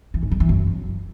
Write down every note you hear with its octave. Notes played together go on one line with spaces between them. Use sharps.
E3
G#2
G3
E3
F#2